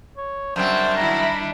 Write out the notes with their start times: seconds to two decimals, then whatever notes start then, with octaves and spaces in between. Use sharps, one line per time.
0.17 C#5
0.56 F#2 C#3 G3 C4 D4 C5
0.96 D#3 E4 A#5 B5